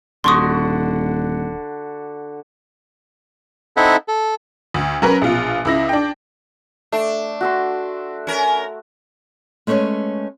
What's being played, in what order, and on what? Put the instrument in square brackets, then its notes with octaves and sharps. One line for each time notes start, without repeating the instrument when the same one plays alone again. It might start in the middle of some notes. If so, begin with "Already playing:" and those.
[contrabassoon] D#1 [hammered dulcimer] D3 F#4 [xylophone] C6 C#6 D#6
[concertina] C4 D#4 E4 A4 E5 F#5
A4
[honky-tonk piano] D2
F#3 C#4 A#4 B4
A#1 B2 F4
C#2 E4 A#6
D4 G5
[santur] A3 [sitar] D4
[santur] F#4 E5 C6
[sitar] C#4 A#4
[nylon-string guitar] G#3 A3 C#4 B4 C#5